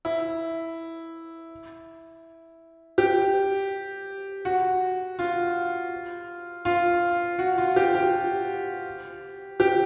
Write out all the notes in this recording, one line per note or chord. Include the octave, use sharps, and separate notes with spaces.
E4
G4
F#4
F4
F4
F#4
F4
G4
G4
G4